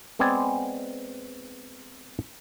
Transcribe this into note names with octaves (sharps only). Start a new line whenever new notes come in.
G#3 B3 C4 D5 G#5